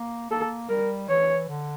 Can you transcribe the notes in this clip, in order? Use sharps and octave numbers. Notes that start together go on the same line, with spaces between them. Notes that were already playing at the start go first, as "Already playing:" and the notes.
Already playing: A#3
A#3 A4
G3 A#4
E3 C#5
D3